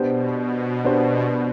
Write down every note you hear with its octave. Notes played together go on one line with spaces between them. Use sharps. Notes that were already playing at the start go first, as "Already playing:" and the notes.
Already playing: B2 B3 D4 G4 C5
B2
B2 B3 D4 G4 C5